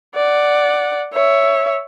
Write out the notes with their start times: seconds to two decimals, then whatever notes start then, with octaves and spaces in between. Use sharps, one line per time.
0.15 D5 F#5
1.13 C#5 E5